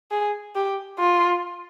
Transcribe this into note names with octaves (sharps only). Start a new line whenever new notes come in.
G#4
G4
F4